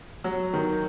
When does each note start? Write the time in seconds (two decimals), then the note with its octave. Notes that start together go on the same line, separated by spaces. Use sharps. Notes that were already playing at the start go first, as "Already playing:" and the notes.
0.24 F#3
0.54 D#3